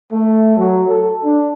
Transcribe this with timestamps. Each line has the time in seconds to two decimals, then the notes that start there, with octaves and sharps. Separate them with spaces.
0.12 A3
0.57 F#3
0.88 A4
1.23 D4